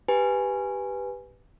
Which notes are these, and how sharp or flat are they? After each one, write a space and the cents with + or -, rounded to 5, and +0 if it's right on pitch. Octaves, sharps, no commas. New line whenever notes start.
G4 +0 B4 +0 G#5 +0